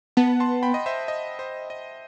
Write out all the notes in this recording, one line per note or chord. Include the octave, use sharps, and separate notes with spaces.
B3 F#5 A5
A5 C6
G5 B5
D#5
C5 E5
D#5
C5
D#5